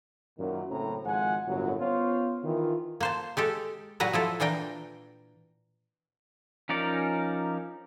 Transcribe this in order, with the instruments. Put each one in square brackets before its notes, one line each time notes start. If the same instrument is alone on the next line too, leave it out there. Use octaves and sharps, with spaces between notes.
[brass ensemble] F#2 A#2 D#3 F#3 E4
F#1 A2 A3 C4 C5 A#5
G#1 F3 G#3 F#5 G#5
G1 F#2 A2 F#3
B3 C#4 F4 C5 C#5
D#3 E3 F4
[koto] A#3 C5 A5
G#3 G4 A4
A#2 F#3 G3 B4 A#5
F3 E4 A4
A#2 E3 D4 A#4 G5
[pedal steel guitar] F3 C#4 D#4 A#4 D5